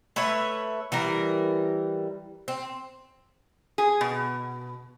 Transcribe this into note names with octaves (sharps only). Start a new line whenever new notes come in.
A3 B4 C#5 E5
E3 G3 A#4
C4
G#4
B2